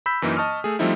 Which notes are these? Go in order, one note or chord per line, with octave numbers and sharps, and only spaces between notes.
B5 E6 G6 B6
F#2 E3 A#3 D#4
D#5 A5 C#6 D#6 F6
A3 G#4
F3 G3 A3 C4 D#4 E4